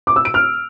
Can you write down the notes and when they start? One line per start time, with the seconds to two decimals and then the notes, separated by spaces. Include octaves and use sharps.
0.07 D6
0.16 E6
0.25 D7
0.34 F6